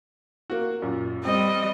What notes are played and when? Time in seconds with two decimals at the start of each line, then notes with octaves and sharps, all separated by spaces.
0.50 A#3 F#4
0.82 F#2 A#2
1.25 G3 C4 D#5